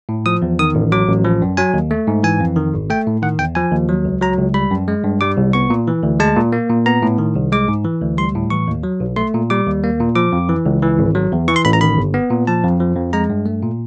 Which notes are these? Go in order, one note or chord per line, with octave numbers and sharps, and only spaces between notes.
A2
F3 D#6
E2
D#3 D#6
A1
F#3 D6
A1
F3
F#2
F#3 G#5
D#2
A3
G#2
E3 G#5
F2
D#3
G#1
A3 G5
A2
D#3 F#5
E2 G5
F3 G#5
D#2
F#3
C#2
F#3 A#5
C#2
G3 B5
F#2
G#3
G2
G3 D6
C2
B3 C#6
A#2
E3
D2
G#3 A5
A#2
A#3
A#2
B3 A#5
A2
D#3
C2
G#3 D6
G#2
E3
D2
G3 C6
A2
E3 C#6
D#2
F#3
B1
A3 C6
A#2
G3 D6
D#2
A#3
A#2
F3 D6
F2
E3
C#2
E3
G#1
F#3
E2
E3 C#6
C6
A1 B5
A#5
D#3 B5
G1
B3
A#2
F3 A5
F2
F3
F2
G#3 A#5
G2
A3
A#2